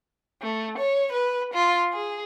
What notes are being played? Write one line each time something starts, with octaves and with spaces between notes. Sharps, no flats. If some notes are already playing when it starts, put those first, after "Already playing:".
A3
C#5
B4
F4
G#4